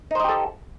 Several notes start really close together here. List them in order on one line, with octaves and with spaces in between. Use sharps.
D#4 C5 D#5 G4 A4